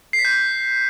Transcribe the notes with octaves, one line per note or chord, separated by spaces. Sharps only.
C7
B6
G6